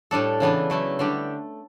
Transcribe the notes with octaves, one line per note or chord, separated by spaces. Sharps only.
A2 G3 D4 A4
C#3 E3 B3 D4
F#3 A3 E4
D3 G3 D4 G4